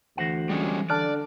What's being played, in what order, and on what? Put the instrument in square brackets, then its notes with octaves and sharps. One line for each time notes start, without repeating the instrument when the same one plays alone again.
[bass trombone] D2 [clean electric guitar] E3 C5 F#5
[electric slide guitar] G3 G#3 C#4
[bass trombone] D3 [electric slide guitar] D5 [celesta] A5 F6 F#6